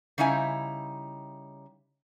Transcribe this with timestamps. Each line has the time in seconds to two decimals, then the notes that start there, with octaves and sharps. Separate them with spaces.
0.18 C#3 G3 D#4 E4 G#5